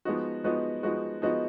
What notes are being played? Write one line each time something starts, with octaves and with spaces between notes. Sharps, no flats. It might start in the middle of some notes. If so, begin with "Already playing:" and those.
F3 G#3 B3 D#4 F#4
F3 G#3 B3 D#4 F#4
F3 G#3 B3 D#4 F#4
F3 G#3 B3 D#4 F#4